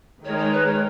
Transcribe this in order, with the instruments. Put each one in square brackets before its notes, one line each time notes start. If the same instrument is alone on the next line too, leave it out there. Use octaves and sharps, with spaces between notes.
[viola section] D#3 G#3 D#4 A#4 [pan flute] C#5
[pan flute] C#5
B4
C#5